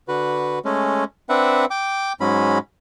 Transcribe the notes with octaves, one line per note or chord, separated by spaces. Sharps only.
D3 F#4 B4
G#3 A3 C#4
C4 D4 B4 E5 F#5
G5 D6
G#2 F#3 G#3 C#4 B5